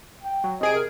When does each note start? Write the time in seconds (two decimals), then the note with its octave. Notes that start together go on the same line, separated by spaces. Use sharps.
0.23 G5
0.44 F#3
0.61 C3 G#4 D#5 D7
0.74 A#4